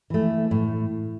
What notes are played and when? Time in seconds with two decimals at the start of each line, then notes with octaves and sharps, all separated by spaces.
0.10 E3 A3
0.51 A2